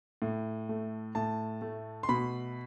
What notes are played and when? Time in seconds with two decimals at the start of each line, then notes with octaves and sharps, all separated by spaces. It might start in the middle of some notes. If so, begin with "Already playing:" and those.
0.22 A2
0.69 A3
1.15 A2 A5
1.62 A3
2.03 C6
2.09 B2 B5